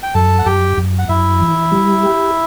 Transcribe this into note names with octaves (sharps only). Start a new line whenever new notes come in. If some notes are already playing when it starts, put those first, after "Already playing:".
G5
F#2 A4 A5
F#5
F#2 G4 G5
F#2
F#5
F#2 E4 E5
E3
G3
G4